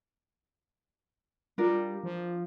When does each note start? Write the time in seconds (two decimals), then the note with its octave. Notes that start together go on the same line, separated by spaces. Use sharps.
1.58 G3 D4 F4 A#4
2.04 F3